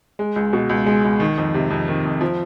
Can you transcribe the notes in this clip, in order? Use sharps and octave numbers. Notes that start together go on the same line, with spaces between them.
G#3
C#2
B2
C#2
G#3
C#2
D#3
F2
C3
F2
D#3
F2
F3